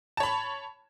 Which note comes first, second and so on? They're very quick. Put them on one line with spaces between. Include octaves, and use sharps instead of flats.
A5 C#5 B5